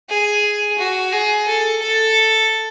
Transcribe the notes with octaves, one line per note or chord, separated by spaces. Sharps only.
G#4
F#4
G#4
A4
A4